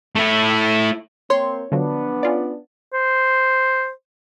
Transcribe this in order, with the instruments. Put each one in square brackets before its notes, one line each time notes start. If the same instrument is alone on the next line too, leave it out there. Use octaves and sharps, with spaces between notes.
[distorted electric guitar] A3 E4
[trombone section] A#3 C4 [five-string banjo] C#5 [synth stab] C6
[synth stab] D3 F3 F#3 [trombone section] B3 D4
[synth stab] C#4 F4 D5
[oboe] C5